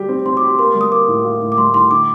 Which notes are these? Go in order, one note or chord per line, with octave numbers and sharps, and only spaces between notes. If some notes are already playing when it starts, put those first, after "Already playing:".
Already playing: G3 G4
C4
C4 C6
D6
G4
C6
A#3 C6
G3
D#6
A#3 D6
A2
F4
A2
D6
G3 C6
A2 C6
D3 D6